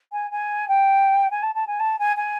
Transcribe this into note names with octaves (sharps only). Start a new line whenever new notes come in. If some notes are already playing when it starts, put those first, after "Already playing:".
G#5
G#5
G5
G#5
A5
A5
G#5
A5
G#5
G#5